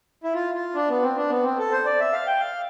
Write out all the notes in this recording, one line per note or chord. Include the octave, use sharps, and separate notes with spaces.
E4
F4
F4
D4
B3
C4
D4
B3
C4
A4
C5
D5
E5
F5
G5
F5